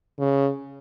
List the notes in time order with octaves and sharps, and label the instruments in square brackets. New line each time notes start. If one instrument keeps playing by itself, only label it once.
[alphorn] C#3